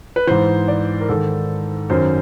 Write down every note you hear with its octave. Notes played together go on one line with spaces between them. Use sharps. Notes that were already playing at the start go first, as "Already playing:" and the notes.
B4
G#2 E3 C5
D5
A#4
G#2 D#3 A4
F#2 D#3 C5